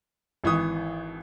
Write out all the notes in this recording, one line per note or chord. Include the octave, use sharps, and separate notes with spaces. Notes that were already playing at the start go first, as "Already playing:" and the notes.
G#1 E3 C#6 D#6